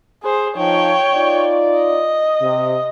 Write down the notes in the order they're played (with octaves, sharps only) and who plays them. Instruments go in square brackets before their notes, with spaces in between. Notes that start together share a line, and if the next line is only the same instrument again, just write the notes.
[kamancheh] G#4 C5
[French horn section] F3 D#4 F4 [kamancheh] C#5 G5
[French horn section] D#4 F4 D5
[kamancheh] D#5
[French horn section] C3